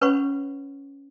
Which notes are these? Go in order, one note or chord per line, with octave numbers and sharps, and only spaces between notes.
C#4 B4 C#5 F#5 B5 C#6